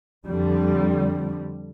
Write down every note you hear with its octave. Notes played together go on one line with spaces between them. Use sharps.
F2 D3 G3